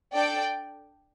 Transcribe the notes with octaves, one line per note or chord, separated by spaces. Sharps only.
D4 A4 D5 G5